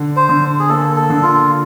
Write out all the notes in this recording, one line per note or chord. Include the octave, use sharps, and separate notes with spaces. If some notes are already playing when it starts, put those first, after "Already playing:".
Already playing: D3
C5
D3
G#4
A#3 A4
A4
D3
F4